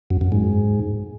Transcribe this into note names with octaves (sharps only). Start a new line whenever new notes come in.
F#2
F#2
G#2